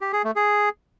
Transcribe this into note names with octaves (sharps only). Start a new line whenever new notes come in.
G4
G#4
A3
G#4